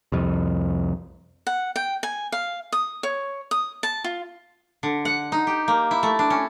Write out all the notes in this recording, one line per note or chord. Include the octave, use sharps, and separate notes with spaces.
C2 F2
F#5
G5
G#5
F5
D#6
C#5
D#6
A5
F4
D3
F#5
D#4
G4
A#3
E4
A3
D4
C#4